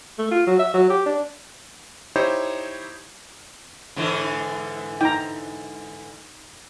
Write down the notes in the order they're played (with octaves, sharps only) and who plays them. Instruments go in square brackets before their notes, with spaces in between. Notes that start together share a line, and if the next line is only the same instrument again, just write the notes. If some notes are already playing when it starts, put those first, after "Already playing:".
[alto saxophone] A3
F4
F#3
E5
F#3
G4
D4
[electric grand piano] D#4 E4 G4 C5 C#5
[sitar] G#2 D3 E3
[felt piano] D#4 [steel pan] G5 A#5